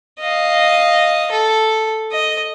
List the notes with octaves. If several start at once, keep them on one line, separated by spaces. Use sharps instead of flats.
D#5 F5
A4
D#5